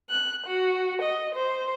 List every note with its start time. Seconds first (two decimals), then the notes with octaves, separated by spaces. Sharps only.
0.10 F#6
0.47 F#4
1.02 D#5
1.35 C5